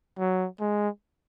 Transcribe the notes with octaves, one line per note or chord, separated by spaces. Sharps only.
F#3
G#3